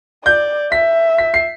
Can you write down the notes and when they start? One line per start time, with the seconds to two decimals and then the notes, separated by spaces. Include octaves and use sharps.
0.25 D5 G6
0.72 E5 B6
1.18 B6
1.34 C7